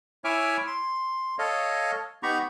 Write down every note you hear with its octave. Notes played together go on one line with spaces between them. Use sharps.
E4 C#5 E5 G#5 D6 F6
C6
A4 C#5 D#5 F5
B3 D#4 G4 A#5 B5 C#6